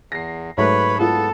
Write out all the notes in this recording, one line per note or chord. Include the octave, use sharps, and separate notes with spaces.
E2 A#6 C7
G#2 F#3 A3 B4 C#5 B5
B3 E4 F4 G#4 A4